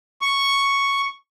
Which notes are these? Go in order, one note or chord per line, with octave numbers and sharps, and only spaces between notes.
C#6